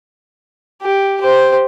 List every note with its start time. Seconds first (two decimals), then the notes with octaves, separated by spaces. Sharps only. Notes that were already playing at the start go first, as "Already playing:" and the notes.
0.82 G4
1.21 G4 C5